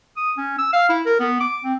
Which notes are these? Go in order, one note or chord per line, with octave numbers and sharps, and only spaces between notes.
D#6
C#4
E6
F5
E4
A#4
B3
D6
C4